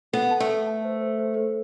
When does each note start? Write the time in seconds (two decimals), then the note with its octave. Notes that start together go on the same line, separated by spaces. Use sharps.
0.13 B3 A4
0.31 A5
0.40 A3
0.49 A4
0.67 A5
0.85 C5
1.01 C5
1.19 C5
1.37 C5